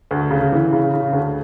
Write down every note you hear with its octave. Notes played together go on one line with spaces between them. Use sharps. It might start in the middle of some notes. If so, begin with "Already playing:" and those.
D2
C#3
E3
C#3
C#3
D2